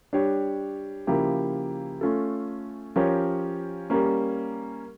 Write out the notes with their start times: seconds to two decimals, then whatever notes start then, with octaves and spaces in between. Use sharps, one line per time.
0.13 G3 D4 G4 C#5
1.07 C#3 F3 A#3 E4 G4
2.01 A3 C#4 F4 A4
2.96 F3 C#4 G4 A#4 C#5
3.90 G3 A#3 C#4